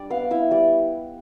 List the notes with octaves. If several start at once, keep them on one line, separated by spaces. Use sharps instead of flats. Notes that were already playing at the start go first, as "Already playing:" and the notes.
Already playing: G3 D4 D5
B3 F5
E4 E5
G3 D5